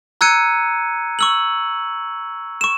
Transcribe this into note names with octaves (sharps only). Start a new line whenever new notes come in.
A#5 E6 F#6 G#6 C#7 D#7
C#6 E6 F#7
C#6 E7